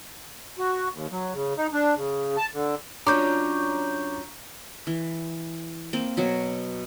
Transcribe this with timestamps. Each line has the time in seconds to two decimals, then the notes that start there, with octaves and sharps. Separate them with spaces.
0.58 F#4
0.93 D#2
1.11 F#3
1.33 C#3
1.57 D#4
1.73 D4
1.96 C#3
2.37 A5
2.53 D3
3.07 F#3 C#4 D4 F4 A#5 C#6 D6 G6
4.87 E3
5.93 A#3 C4
6.17 B2 F#3